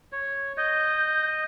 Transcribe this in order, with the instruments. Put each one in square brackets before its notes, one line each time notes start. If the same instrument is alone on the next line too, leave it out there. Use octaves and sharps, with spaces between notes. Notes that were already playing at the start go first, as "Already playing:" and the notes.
[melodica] C#5
[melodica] D#5 [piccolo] G6